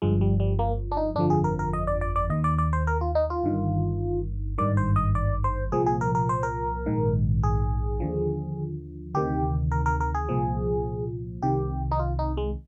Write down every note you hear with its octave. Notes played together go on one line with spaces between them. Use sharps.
G1 G2 F3 G#3
G3
G3
A#3
D4
D#4
G1 F2 D3 F3 D4
G#4
A#4
A#4
D#5
D5
D5
D5
D#2 D#3 D#5
D5
D5
C5
A#4
F4
D#4
F4
G1 G2 D#3
G#1 G2 D#3 D5
C5
D#5
D5
C5
C2 A#2 F3 G#4
G#4
A#4
A#4
C5
A#4
A#1 G#2 D#3
G#4
D#2 D3 F3
D2 C3 D#3 G4
A#4
A#4
A#4
G#4
C2 A#2 F3
C2 C3 D#3 G4
D#4
F4
D#4
G#3